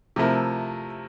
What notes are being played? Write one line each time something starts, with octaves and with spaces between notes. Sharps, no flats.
C3 F3 A3 E4 A#4